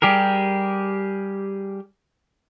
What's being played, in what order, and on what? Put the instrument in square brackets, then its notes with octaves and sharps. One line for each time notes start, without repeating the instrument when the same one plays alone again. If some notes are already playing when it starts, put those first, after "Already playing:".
[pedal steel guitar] G3 G4 G#4 A#4